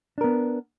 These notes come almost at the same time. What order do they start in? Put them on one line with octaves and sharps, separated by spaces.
D4 A#4 B3